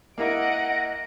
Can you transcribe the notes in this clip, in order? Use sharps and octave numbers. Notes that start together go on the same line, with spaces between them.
A#3 E4 A#4 D#5 F#5 D7